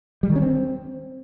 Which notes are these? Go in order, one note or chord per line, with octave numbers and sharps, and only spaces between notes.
G3
D#3
C#4
C4